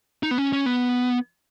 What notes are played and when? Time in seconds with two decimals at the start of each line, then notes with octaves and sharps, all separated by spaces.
0.23 D#4
0.31 B3
0.38 C#4
0.53 C#4
0.66 B3